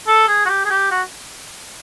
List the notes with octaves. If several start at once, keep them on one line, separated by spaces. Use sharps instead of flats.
A4
G#4
F#4
G4
G#4
G4
F#4